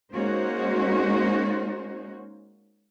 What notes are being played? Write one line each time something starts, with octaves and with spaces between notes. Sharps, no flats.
G#3 A#3 C#4 D#4 F#4 C5